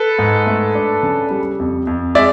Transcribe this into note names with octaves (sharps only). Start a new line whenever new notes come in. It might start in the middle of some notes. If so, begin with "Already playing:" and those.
Already playing: A4 B4
G#2
A3
D4
C#3
G3
F2
F2
G#3 D5 E5